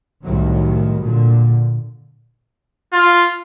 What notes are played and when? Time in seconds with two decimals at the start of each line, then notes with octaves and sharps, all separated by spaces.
0.24 C2 A2 D#3 F#3
1.00 A#2 D3
2.93 F4